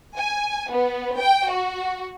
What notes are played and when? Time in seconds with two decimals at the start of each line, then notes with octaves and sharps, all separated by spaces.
0.16 G#5
0.72 B3
1.19 G5
1.51 F#4